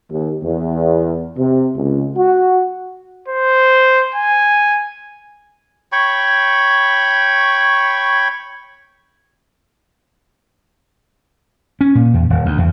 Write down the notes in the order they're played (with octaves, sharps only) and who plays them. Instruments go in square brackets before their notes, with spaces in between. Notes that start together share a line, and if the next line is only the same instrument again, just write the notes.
[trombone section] D#2
E2
C3
C#2
F#4
[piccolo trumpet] C5
G#5
[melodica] C#5 G5 B5 C#6
[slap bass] C#4
A#2
E2
D#1
D2
E2